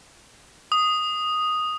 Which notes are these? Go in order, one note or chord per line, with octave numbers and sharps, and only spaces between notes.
D#6